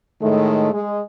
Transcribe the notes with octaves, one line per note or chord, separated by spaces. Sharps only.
A2 D#3 G#3 A3
G#3